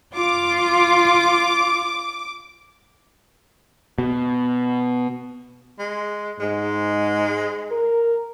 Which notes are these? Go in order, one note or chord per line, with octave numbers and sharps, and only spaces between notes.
F4 D6
B2
G#3
G#2 G#3
A#4